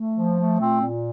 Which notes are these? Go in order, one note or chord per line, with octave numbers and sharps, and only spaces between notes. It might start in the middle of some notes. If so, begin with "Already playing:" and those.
Already playing: A3
F3
A3
A#2 C4
A#2